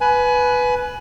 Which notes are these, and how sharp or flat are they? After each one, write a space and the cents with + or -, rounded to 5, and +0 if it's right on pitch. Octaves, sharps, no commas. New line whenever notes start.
B4 +0 G#5 +25